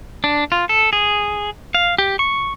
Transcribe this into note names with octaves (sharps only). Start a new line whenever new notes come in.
D4
F4
A4
G#4
F5
G4
C#6